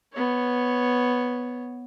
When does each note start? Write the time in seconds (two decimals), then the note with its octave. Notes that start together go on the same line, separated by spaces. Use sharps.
0.13 B3 C#5